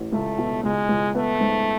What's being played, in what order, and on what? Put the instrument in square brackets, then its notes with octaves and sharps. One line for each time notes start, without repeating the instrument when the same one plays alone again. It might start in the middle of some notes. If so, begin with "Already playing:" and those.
Already playing: [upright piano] A1
[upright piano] C#2 [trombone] A3
[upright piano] B2
[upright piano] C#2 [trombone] G#3
[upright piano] C#2
[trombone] A3 [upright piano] B3
[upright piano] G#2